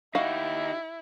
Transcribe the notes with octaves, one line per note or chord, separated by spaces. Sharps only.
D#4 E4 F#4 G4 D#5 F5